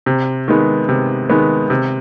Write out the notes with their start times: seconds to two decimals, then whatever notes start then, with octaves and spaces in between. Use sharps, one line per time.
0.06 C3
0.48 D#3 G#3 B3
0.89 C3
1.30 D#3 G#3 B3
1.70 C3